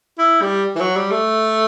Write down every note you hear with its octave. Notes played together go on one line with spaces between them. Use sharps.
E4
G3
E3
F#3
G3
A3